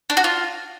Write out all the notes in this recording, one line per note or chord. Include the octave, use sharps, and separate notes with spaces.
D4
F#4
F4